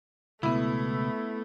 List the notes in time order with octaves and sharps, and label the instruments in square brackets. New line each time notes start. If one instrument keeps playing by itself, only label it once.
[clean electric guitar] C#2 B2 [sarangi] A3 [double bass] B3 [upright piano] E4